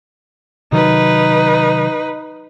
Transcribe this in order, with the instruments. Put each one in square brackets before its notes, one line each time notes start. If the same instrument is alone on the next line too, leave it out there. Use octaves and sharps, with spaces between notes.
[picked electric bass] C3 D#3 F#3 [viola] D#4 B4